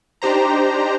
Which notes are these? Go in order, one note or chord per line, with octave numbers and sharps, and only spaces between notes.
D4 D#4 G4 C5 A#5